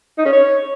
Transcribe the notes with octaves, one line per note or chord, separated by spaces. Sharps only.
D#4
C#4
C#5